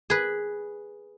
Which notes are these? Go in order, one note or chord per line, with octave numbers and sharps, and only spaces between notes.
G#4 B4